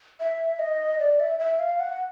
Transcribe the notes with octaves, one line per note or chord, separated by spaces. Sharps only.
E5
D#5
D5
E5
E5
F5
F#5